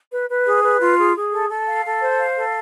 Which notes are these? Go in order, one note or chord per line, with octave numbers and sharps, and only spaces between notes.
B4
B4
G#4
B4
F4
G#4
G#4
A4
A4
F5
A4
C5
F5
A4